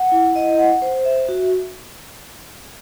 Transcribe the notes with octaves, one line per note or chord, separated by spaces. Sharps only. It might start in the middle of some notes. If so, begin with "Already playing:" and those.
Already playing: F#5
E4
D#5
F#5
C5
E5
F#4